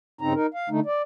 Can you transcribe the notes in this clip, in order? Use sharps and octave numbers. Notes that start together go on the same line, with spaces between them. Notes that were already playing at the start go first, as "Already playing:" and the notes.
G2 C#3 C4 D#4 A#5
D#4 A#4
F5
D3 A3 D#4
D5